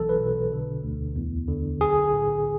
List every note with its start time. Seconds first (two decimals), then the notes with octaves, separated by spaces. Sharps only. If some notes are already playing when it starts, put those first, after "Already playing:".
Already playing: B1 E3 A4
0.09 B4
0.19 B2
0.52 D3
0.83 D2
1.16 E2
1.48 D3
1.80 B1 G#4
2.13 A2